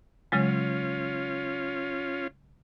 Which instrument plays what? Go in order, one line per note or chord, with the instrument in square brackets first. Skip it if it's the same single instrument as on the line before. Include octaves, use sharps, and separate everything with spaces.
[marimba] C#3 F#3 G#3 [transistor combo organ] C#4 F4